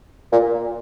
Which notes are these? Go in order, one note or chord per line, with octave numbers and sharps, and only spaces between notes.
A#2